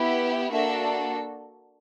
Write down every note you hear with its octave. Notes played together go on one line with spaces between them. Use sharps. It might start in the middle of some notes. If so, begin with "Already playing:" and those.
Already playing: B3 E4 G4
A#3 D4 F#4 A4 E5